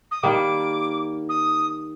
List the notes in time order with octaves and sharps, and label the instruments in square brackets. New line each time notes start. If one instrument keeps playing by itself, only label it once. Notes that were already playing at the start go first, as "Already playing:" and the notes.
[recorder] D#6
[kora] D#3 G3 A#3 [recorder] D6
[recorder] D#6